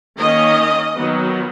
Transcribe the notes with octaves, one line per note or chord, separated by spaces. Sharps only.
D#3 A#3 C#4 D#5
D#3 F#3 B3